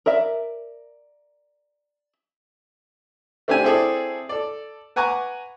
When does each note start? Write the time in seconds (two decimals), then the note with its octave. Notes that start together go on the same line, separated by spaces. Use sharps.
0.06 A#4 D5 E5
3.48 A3 C4 D4 G4 E5 G#5
3.64 C4 E4 G#4 A4 D5
4.29 A4 D5
4.96 B4 F#5 G#5 A#5 C#6 D6